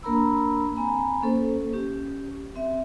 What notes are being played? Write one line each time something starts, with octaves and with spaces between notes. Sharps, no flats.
A#3 D4 A#4 A#5 B5 E6
C4 G#5 A#5 B5
A#3 C#4 A4 C5
C#4 G4
C4 E5